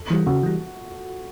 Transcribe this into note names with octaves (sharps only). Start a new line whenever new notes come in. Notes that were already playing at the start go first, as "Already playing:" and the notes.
Already playing: A4
E3 G3
C#3 F#4
E3 G3